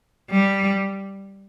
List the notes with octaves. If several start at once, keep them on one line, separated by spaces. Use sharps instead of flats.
G3